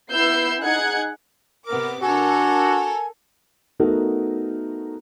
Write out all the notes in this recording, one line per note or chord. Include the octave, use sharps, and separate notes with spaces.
B3 E4 E6 G6 C7
D#4 G#4 F#5 F#6 G#6
C3 B3 A#4 D6
D4 F#4 A4 A#4 G#5
A3 B3 D#4 F#4 A4 A#4